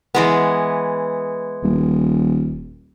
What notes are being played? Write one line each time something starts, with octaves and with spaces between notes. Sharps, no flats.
E3 G#3 B3
D#1